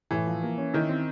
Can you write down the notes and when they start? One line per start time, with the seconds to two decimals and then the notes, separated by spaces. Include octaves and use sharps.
0.11 A2 E3
0.27 F3
0.43 A#3
0.57 C#4
0.73 D#3 E4
0.89 C4